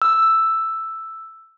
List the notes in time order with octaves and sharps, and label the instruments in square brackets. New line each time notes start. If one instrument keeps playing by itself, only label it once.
[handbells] E6